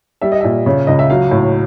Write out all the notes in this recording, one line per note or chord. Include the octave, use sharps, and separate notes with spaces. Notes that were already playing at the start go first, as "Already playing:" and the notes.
G3 E5
D#5
A#2 E5
C#3
C#2 D#5
E5
F#3 F5
A2